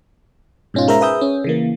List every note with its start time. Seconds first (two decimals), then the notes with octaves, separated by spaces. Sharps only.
0.74 G#2 B2 C#4 D#4 F4
0.88 G#3 A#4 C5 E5 A#5
1.01 G#4 B4 E5 D#6 E6 G6
1.21 C#4
1.44 C#3 E3 A#3